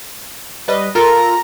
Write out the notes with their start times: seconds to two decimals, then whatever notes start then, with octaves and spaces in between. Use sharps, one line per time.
0.68 G3 B4 D#5
0.95 F4 A4 A#4 A#5